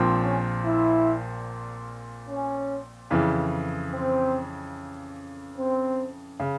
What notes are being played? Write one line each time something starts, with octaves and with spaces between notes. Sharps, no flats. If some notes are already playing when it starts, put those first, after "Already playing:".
Already playing: A#1 A#2 F3 C4
C#4
E4
C#4
F2 C#3 E3
C4
C4
C#3